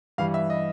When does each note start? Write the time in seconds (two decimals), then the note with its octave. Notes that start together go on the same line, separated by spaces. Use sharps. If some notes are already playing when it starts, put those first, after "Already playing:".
0.18 G2 E3 G3 F5
0.34 E5
0.50 D#5